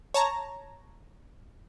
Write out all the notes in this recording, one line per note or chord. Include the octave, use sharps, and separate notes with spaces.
C#5 A5 A#5